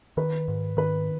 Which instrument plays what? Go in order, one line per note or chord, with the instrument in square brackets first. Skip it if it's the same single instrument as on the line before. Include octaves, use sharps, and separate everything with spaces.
[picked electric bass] D#3 [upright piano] B4
[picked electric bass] G#2
[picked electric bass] D#3 [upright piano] B4